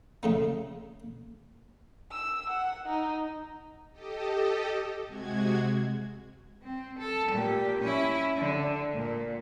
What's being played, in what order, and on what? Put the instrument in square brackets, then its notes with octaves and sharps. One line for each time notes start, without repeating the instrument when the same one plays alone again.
[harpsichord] C#3 A3 D#4
[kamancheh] E6
F#5
D#4
[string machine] G4 A4 D#5
C3 G#3 F#4 G#6
[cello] C4
A4
A#2 G4
C#4 E4
D3
A#2